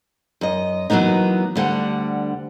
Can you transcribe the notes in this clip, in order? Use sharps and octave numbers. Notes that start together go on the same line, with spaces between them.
F#2 D#5
E3 F#3 G#3 A#3 B3 D#4
D2 D3 G3 F#5